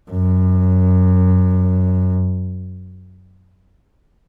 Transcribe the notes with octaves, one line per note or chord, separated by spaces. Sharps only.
F#2